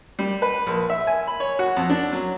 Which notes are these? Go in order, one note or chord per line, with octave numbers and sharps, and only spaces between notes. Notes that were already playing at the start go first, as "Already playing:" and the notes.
G3
B4
A#1
E5
G#5
B5
C#5
F#4
F2
D4
F#3